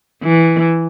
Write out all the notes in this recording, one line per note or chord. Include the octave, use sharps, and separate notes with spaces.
E3